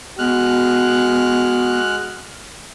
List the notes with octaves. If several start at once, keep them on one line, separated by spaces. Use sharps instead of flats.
G#3 B3 F#4 F6 F#6